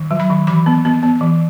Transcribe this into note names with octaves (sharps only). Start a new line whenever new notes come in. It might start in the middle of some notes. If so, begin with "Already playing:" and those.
Already playing: D#3
F#3
B5
D#3
E3 B5
B3
B3
B3
E3